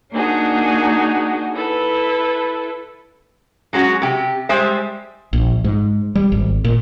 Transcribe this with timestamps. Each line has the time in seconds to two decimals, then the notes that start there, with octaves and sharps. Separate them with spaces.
0.11 A#3 D4 D#4 F#4 G#4
1.53 E4 A4 B4
3.73 F#3 G#3 C#4 F#4
4.02 C3 G4
4.49 G3 G#3 C5 E5
5.33 A#1
5.64 G#2
6.15 G3
6.32 G#1
6.65 A#2